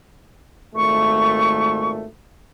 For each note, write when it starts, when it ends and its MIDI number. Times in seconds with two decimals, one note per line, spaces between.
0.76 2.07 32
0.76 2.07 46
0.76 2.07 57
0.76 1.90 85